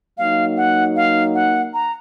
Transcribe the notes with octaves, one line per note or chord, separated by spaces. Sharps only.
F#3 A#3 D#4 F5
F#5
F5
F#5
A#5